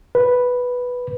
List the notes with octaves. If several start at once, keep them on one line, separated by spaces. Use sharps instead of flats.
B4